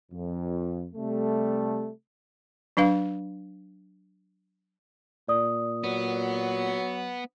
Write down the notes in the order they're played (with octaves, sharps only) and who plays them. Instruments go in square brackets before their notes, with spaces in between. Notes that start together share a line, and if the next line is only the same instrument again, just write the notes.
[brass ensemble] F2
C3 G3 A3
[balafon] F#3 D4 B4 F5
[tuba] A#2 [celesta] D5 D#6
[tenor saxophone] F#3 [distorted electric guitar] B3